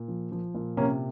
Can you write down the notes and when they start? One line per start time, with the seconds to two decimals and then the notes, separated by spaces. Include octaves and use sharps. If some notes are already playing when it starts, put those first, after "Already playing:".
Already playing: A#2
0.08 F3
0.32 F3
0.55 A#2
0.77 C3 A#3 C#4